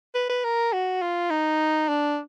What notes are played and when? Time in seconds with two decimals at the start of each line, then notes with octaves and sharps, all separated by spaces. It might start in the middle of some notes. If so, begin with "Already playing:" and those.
0.15 B4
0.30 B4
0.44 A#4
0.73 F#4
1.02 F4
1.30 D#4
1.89 D4